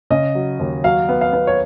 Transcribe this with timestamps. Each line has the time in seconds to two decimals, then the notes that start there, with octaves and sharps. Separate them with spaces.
0.10 C#3 D#5
0.35 F#3
0.60 D#2
0.84 F#3 F5
1.09 B3
1.21 F5
1.33 B3
1.47 C#5